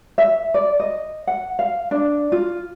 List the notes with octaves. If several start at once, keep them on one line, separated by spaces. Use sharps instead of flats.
E5
D5
D#5
F#5
F5
D4
F4